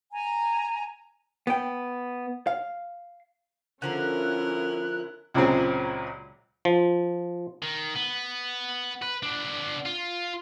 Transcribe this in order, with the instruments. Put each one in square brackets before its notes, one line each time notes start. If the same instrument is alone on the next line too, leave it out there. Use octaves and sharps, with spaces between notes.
[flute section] G#5 A#5
[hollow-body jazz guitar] B3 G5
F5
[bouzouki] D3 F3 A#3 [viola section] C#4 E4 [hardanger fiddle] A#4 [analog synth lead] F#6
[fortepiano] C#2 A#2 C#3 F#3 G#3 C4
[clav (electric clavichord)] F3
[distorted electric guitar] D#3
B3
B4
B3 D4
F4